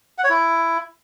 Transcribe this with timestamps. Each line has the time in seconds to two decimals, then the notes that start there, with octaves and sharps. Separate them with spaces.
0.18 F#5
0.24 C#5
0.30 E4